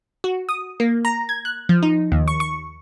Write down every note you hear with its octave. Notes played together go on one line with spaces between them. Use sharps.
F#4
D#6
A#3
A#5
G#6
F#6
F3
D#4
D#2
C#6
C#6